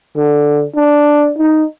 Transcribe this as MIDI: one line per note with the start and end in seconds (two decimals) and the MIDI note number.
0.16 0.64 50
0.76 1.32 62
1.38 1.64 63